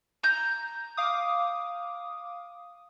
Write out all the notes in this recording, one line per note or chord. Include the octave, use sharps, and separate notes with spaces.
A#5 G6
F5 D6 D#6